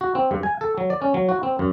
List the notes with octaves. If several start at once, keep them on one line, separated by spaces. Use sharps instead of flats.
F#4
C4
G2
G#5
A4
F#3
D5
C#4
F#3
F#4
C4
F#2